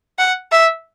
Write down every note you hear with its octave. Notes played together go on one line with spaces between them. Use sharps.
F#5
E5